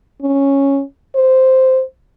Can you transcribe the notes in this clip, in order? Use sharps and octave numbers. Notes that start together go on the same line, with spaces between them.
C#4
C5